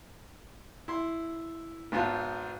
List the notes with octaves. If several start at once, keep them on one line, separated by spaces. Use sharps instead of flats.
E4 C6
G#1 G#2 B3 F4 F5 A5